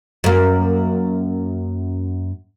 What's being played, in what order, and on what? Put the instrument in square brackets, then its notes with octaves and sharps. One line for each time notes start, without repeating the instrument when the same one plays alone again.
[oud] F#2 A#3